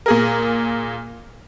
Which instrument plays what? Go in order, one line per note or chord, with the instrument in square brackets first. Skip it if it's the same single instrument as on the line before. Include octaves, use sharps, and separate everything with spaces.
[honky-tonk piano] A#2 G#4 A#4